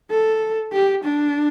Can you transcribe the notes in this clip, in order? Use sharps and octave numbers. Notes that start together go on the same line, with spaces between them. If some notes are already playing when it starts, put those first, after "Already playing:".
A4
G4
D4